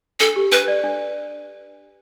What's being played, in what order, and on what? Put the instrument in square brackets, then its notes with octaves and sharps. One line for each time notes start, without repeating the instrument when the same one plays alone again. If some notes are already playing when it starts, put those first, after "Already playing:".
[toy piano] D4 [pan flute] A4
[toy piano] G4
[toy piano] D4 [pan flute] B4
[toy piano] D5
D4